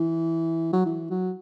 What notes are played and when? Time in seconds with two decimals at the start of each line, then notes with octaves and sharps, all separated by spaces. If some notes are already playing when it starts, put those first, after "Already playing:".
Already playing: E3
0.73 F#3
0.86 E3
1.11 F#3